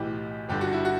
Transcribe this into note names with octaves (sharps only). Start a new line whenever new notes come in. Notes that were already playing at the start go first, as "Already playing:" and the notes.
Already playing: B1 A2 E3 G4
G1 G2 D3 G4
F#4
E4
F#4